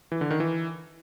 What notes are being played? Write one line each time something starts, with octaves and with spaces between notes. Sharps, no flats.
E3
D3
D#3
E3